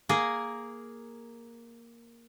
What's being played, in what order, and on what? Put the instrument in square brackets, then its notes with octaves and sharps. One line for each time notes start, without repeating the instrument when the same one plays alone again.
[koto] A#3 G#4 A#4